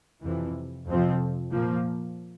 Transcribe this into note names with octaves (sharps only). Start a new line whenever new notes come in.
F2 C3 E3
F2 C3 F3 C4
A#2 F3 A#3